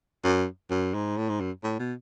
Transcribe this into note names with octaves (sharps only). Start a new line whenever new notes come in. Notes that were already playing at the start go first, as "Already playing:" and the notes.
F#2
F#2
G#2
A2
G#2
F#2
A2
B2